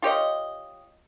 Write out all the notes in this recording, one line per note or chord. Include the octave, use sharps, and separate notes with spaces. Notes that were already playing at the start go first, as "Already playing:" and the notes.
F4 G4 C#5 D#5